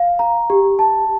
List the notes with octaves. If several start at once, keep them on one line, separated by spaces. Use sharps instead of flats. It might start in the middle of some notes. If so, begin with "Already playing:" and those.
Already playing: F5
A#5
G4
A5